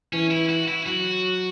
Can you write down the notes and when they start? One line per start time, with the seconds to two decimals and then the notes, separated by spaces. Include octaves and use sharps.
0.13 E3 C#4
0.31 E4
0.49 F#4
0.68 E4
0.86 F#3 F#4